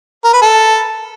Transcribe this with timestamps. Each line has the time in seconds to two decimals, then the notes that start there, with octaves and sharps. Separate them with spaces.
0.24 A#4
0.33 B4
0.42 A4